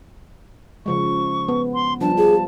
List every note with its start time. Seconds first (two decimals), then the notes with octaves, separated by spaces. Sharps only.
0.86 C#3 F3 G#3 C#6
1.48 B3
1.74 C6
2.01 F3 G3 D4 A5
2.17 F4 G#4